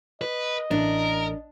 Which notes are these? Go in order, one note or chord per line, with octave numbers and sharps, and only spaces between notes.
B4 D#5
A1 D4 A#4